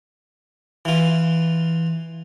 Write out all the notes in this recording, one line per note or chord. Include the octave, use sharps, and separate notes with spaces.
E3 F4